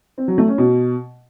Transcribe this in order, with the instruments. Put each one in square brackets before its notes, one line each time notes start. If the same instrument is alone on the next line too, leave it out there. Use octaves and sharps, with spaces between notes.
[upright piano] C4
F#3
A3
C#4
B2